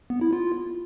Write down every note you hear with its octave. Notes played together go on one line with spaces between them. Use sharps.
B3
E4
F4